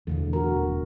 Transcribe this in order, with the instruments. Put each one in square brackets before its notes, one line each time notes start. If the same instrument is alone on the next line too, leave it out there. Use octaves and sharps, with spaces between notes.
[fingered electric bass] E2 [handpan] B2 D3 A3
[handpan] F#4 A#4
[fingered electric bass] D#1